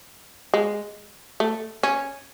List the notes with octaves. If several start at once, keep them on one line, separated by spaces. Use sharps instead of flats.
G#3
A3
C#4